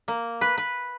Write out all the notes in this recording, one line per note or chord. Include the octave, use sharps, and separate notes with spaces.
A#3
B4
B4